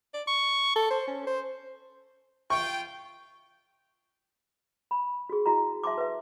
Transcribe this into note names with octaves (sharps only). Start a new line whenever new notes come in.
D5
C#6
A4
C5
C#4
C5
F4 G5 C#6
B5
F#4 G#4
E4 F#4 D#5 A#5
E5 A5 C6 D6
B4 E5